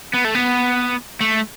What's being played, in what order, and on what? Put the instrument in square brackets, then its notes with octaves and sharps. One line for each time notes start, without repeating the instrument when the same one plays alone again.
[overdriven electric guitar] B3
A3
B3
A3